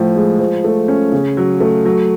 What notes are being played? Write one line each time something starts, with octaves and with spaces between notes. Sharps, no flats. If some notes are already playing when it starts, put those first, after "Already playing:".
Already playing: A2 F3
G#3
F3
A3
C#4
C#3
F#3
A3
F#3